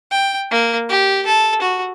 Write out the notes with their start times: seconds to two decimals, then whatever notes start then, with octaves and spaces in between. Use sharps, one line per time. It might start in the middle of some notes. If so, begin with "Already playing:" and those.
0.11 G5
0.51 A#3
0.89 G4
1.26 A4
1.62 F#4